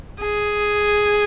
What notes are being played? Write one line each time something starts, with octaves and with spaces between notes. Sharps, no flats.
G#4